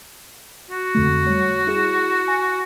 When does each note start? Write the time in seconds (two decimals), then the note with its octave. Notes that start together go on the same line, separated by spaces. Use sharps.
0.71 F#4
0.95 F2 D3 A3
1.26 G3 C#5
1.67 E4 G#4 E7
2.28 G#5